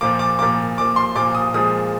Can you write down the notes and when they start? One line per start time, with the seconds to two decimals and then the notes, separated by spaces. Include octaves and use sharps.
0.01 A#2 F3 A#3 D6
0.19 D6
0.39 A#2 F3 A#3 D6
0.78 A#2 F3 A#3 D6
0.96 C6
1.15 A#2 F3 A#3 D6
1.35 D#6
1.54 A#2 F3 G#3 D#6